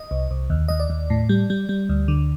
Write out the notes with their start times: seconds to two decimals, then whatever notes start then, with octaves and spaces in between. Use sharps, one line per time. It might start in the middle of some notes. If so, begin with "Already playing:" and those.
Already playing: D#5
0.11 C2
0.31 C2
0.50 D#2
0.68 D#2 D#5
0.80 D5
0.90 D#2
1.10 A2
1.29 G3
1.50 G3
1.69 G3
1.89 D2
2.08 D3